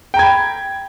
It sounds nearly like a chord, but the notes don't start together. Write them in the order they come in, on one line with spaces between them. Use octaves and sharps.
G5 A#5 G#6 B5